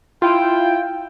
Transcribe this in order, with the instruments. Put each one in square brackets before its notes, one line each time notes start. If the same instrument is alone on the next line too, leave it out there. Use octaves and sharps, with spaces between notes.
[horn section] E4 G5 [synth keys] F4